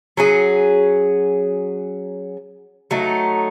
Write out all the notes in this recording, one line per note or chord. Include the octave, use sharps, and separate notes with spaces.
F#3 C#4 G#4
F#3 A3 D#4